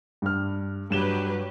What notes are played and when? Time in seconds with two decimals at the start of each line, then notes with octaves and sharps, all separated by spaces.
0.22 G2 F6
0.91 G2 F#3 G4 B4 E7 G7